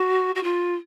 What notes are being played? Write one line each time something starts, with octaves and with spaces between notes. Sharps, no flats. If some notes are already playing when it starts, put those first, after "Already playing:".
Already playing: F#4
F#4
F4